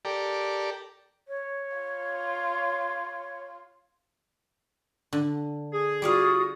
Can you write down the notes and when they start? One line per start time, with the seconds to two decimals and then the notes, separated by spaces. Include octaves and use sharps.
0.05 G4 A4 A#4 D5
1.28 C#5
1.77 F4
5.13 D3
5.72 G#4
6.02 G3 F4 F#4 D5 F5 D#6